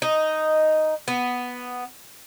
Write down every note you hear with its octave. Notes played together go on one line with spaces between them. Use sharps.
D#4
B3